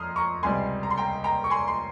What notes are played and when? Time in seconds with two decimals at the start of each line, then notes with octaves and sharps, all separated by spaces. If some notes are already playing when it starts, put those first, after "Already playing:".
Already playing: F2 A#5 C6 D#6 F6
0.16 A#5 C#6
0.43 C#2 C3 G3 G#5 C6
0.83 A#5
0.91 C6
0.97 G5 A#5
1.24 G5 A#5
1.44 C#6
1.50 G#5 C6
1.68 C6